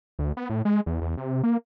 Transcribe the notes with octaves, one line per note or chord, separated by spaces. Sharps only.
D2
B3
A2
G#3
E2
E2
C3
A#3